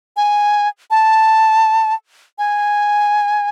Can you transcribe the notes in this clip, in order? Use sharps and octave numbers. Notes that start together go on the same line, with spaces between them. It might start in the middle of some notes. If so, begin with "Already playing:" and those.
G#5
A5
G#5